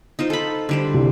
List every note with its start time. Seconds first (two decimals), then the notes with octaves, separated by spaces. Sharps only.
0.19 D#4 F4 C5
0.30 A4 B5
0.69 D3 G3 C5
0.94 C2